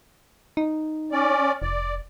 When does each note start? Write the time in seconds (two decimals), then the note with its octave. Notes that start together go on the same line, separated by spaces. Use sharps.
0.57 D#4
1.12 C#4 D5
1.62 F1 D5